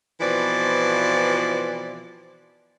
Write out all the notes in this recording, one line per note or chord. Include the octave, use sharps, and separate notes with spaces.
B2 E3 F3 C4 F4 D5